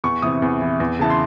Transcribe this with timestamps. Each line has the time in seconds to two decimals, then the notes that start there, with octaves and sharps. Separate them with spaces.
0.04 E2 C#6
0.22 C3 E3 D#6
0.42 E2
0.61 C3 E3
0.80 E2
0.99 C#3 E3 A5
1.10 C6